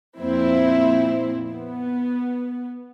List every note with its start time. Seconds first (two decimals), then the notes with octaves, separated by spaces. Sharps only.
0.18 F2 A#2 C4 E4
1.49 B3